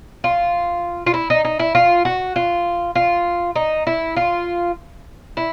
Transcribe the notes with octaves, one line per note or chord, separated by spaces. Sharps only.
F4
F4
E4
D#4
D#4
E4
F4
F#4
F4
F4
D#4
E4
F4
E4